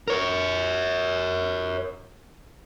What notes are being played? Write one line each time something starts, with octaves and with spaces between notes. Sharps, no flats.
A#4 C#5